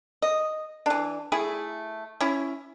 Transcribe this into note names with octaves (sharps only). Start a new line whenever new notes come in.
D#5
E3 D4
A3 E4 G#4
C#4 E4